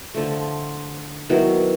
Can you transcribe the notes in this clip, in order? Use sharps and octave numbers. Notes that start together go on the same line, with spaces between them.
D3 F3 A3
D#3 F#3 B3 E4